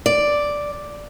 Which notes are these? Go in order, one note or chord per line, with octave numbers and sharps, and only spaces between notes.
D5